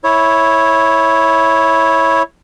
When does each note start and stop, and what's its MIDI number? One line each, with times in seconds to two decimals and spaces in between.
0.04 2.23 64
0.04 2.23 73